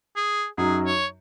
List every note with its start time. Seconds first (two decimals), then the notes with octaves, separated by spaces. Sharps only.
0.16 G#4
0.58 F#2 F#3 D#4 F#4 G#4
0.86 C#5